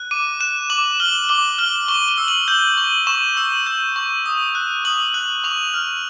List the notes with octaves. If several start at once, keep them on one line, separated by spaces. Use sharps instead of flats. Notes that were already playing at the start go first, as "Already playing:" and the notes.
Already playing: F#6
D6 D#7
F#6 E7
D6 F#7
F6 G7
D6 G7
F6 G7
C#6 G7
G7
E6
F#7
G6 G7
C#6
C#6 E7
E6
G6
C#6
D#6
F#6
D#6 F#7
F#6 F#7
C#6 F7
F6